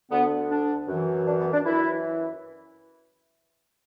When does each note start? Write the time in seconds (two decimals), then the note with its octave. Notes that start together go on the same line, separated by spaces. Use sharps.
0.11 D2 D3 B3
0.49 D4
0.88 F#2 E3
1.27 D4
1.40 B3
1.53 D4
1.65 F#2 E3 E4